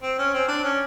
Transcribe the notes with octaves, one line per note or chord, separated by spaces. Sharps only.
C4
C#4
C4
D4
C#4